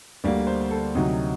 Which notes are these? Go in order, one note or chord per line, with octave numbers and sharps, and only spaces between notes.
D2 D3 G3 A#3 D5
C5
A4
D2 C3 F#3 D#4